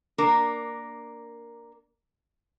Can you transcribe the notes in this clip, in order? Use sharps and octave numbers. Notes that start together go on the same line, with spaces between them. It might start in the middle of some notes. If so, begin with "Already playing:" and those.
A#3 D4 A#4